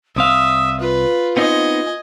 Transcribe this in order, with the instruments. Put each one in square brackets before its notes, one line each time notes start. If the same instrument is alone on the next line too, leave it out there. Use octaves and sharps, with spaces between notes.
[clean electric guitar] C2 C4 F5 [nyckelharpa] E5 [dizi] D#6
[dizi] F4 [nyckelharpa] B4
[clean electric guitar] B3 C4 D#4 [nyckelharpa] D#5 G#5